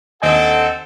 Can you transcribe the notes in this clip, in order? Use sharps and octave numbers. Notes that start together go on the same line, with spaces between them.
D#2 D3 C4 A4 D#5 F#5 G#5